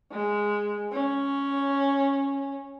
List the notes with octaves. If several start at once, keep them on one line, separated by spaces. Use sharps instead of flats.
G#3
C#4